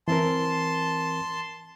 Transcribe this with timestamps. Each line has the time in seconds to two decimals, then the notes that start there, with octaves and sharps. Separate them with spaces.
0.08 E3 C4 A#4 A5 C6